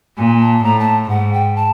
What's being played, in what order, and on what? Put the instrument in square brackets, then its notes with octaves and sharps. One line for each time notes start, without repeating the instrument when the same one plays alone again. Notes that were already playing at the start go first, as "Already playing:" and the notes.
[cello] A#2 [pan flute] G#5
[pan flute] A5
[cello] A2 [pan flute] A#5
[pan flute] A5
[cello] G#2 [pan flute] F#5
[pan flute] G5
A5